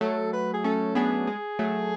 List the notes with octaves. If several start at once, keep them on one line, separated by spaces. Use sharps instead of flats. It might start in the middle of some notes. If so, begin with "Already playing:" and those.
F#3 A3 A4
B4
G#4
A3 C#4 A4
B3 D4 G#4
G#3
F#3 A3